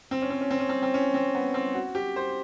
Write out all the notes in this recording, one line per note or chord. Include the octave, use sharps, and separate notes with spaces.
C4
C#4
C4
C#4
C4
C#4
C4
C4
C#4
C4
B3
C4
F#4
G4
C5